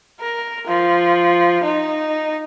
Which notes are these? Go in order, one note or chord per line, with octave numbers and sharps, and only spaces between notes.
A#4
F3
D#4